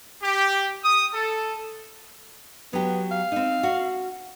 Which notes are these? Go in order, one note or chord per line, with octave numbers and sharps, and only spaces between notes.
G4
D#6
A4
F#3 B3 G4
F5
C4 D#4
F#4